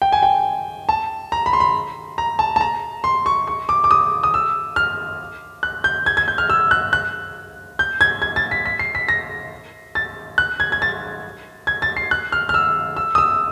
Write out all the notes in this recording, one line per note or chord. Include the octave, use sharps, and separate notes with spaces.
G5
G#5
G5
A5
A#5
B5
C6
B5
A#5
A5
A5
A#5
C6
C#6
C#6
D6
D6
D#6
D#6
E6
F6
F#6
G6
G#6
G#6
G6
F6
E6
F#6
F#6
G6
G#6
G#6
A6
B6
B6
C7
B6
A#6
A6
F#6
G#6
G#6
A6
G#6
A6
C7
F#6
F6
F6
E6
E6
D#6
E6